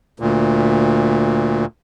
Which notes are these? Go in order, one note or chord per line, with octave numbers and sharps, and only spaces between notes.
D2 A#2